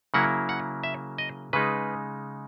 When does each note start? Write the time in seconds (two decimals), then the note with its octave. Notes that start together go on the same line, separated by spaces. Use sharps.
0.14 C#3 F#3 A#3 E4 F#5
0.49 F#5
0.83 E5
1.18 D#5
1.53 C#3 G#3 D#4 B4